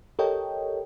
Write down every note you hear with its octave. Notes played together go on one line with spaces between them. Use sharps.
G4 A4 A#4 C#5 D#5 G5